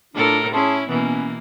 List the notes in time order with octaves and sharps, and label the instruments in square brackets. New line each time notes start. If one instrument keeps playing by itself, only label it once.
[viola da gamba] A2 A4 A#4 [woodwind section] D4 F4
[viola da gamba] C#4 E4 [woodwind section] G#4 A5 C6
[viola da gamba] B2 E3 A#3 [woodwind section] B3 C#4